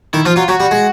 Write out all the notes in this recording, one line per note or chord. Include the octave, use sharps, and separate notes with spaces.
D#3 E4
F3 F4
F#3 F4
F#3 F#4
G3
G#3